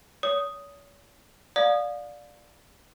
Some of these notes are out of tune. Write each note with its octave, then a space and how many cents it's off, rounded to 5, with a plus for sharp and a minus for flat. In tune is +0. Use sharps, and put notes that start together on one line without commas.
C#5 +40 D#6 +0
D5 +0 F5 +25 D#6 -20